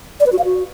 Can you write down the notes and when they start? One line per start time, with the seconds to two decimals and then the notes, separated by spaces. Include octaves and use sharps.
0.20 D5
0.26 B4
0.32 F#4
0.39 F5
0.45 F#4